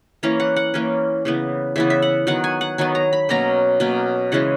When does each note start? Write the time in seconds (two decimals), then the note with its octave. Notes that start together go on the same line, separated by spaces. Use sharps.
0.23 E3 A#3 C#4 A#5
0.40 F#5
0.56 F#5
0.74 E3 A#3 C#4
1.25 C#3 E3 B3
1.76 C#3 E3 B3 E5
1.90 E5
2.02 F#5
2.27 D#3 F#3 B3 F#5
2.44 G#5
2.61 F#5
2.78 D#3 F#3 B3 G#5
2.95 A#5
3.13 B5
3.29 B2 F#3 A#3 C#4 A#5
3.80 B2 F#3 A#3 C#4
4.32 C#3 E3 G#3 C#4 F#5